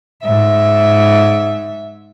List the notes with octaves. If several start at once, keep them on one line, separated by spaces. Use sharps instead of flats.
G#2 E5